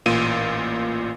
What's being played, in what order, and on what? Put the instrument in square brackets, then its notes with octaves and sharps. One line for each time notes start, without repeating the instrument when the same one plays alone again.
[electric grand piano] A1 A#2 F4 D#7